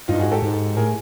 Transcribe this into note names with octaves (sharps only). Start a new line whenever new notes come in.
G2 D#4 F4
F#4 G#4
G#2
G4 A4
G#2
A2 G#4 A#4